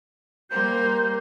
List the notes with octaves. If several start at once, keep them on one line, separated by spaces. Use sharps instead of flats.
G3 A#3 C5 G6